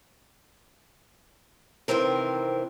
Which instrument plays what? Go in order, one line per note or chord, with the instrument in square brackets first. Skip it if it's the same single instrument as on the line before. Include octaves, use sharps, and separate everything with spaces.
[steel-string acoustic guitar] C3 D#3 E3 C4 A#4